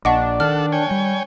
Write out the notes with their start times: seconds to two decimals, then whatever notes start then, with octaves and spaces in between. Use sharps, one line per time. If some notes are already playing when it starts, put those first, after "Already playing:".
0.05 A#1 D4 D#5 F#5 C#6
0.40 D#3 A4 F#5 F6
0.72 C#5 G5 G#5
0.91 G3